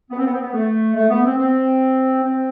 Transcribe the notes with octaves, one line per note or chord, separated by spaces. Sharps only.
B3
C4
B3
C4
B3
A3
A3
B3
C4
C4
C4